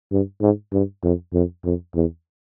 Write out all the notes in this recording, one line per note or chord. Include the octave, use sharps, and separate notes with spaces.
G2
G#2
G2
F2
F2
F2
E2